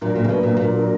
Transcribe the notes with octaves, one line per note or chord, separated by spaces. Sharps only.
A#2 F#3 A#3 D4 A#4
A#2
C#3
B2
A#2
A#2